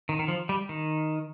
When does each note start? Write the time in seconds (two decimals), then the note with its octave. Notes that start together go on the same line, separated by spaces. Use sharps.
0.09 D#3
0.19 D#3
0.28 F3
0.49 G3
0.69 D#3